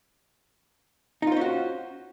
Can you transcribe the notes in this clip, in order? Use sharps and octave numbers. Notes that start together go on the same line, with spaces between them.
C#4 D#4 F4 F#4 C5